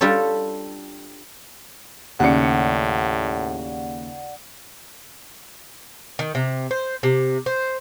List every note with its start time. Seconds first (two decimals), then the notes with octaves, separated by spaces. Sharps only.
0.01 G3 D4 F4 G4 A4 C#5
2.20 D#2 A2 C#3 D5 F#5 C#7
6.19 D#3
6.35 C3
6.71 C5
7.03 C3
7.46 C5